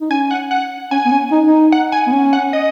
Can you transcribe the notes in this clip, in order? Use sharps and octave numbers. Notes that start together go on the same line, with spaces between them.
D#4
C#4 G#5
F#5
F#5
C#4 G#5
B3
C#4
D#4
D#4
F#5
G#5
B3
C#4
F#5
D#5